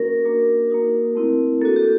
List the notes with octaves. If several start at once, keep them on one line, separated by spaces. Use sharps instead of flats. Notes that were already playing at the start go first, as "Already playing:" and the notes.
Already playing: A#3 C#4 F#4 A#4
A#3 D4 F#4
A#3 D#4 F#4
A3 C4 E4
A#3 D4 F#4 A4
G4